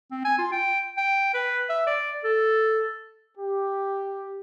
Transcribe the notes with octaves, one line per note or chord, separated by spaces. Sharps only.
C4
G#5
F4
G5
G5
B4
E5
D5
A4
G4